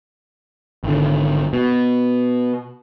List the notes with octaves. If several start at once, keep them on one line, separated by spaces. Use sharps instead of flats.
G#1 D3
B2